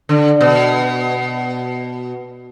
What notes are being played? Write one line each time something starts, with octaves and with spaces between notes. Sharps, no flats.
D3
B2